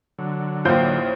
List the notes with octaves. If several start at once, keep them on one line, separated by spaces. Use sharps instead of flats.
D3 F#3
A1 D#2 F4 C5 G5 G6